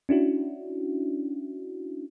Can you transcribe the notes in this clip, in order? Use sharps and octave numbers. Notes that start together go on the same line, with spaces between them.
C#4 D4 E4 F#4